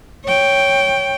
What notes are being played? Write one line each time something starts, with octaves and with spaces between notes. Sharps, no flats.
C#5 G5